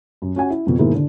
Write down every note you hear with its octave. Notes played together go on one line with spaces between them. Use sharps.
F#2
C#4 F#4 F#5 G#5
E4
F2 B2
G#2 B2 D#3 G#3 A#3 E4
D3 D4